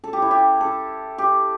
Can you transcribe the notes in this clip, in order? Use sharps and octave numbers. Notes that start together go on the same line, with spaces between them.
A4
G4
E4
G4
A4
G4